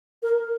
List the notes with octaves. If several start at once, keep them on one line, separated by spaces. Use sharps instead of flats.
A#4